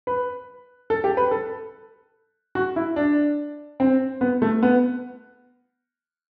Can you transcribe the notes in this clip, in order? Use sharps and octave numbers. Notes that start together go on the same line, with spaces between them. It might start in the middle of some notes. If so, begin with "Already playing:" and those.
B4
A4
G4
B4
A4
F#4
E4
D4
C4
B3
A3
B3